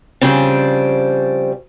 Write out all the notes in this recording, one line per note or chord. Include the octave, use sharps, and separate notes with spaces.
C#3 F3 G3 C4 D4